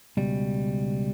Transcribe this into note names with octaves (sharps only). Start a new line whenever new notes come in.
C#2 B2 G3